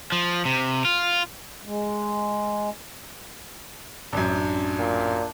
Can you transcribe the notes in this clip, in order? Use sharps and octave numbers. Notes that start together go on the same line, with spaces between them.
F3
C3
F4
G#3
A1 F#2 D4
A#2